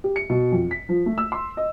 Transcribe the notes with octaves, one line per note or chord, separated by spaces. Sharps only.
G4
C#7
B2
F2
B6
F3
A3
E6
C6
D#5